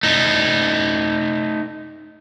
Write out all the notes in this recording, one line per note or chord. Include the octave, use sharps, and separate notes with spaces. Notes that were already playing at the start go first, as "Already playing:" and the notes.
A3 D#4